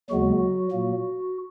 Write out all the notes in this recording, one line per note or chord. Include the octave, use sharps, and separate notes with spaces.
D#2 C#3 F#3 G#3 B3 F#4
A#2 F#3 A#3